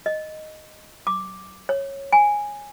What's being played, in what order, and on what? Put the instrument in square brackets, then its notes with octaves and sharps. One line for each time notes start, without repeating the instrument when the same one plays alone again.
[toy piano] D#5
D6
C#5
G#5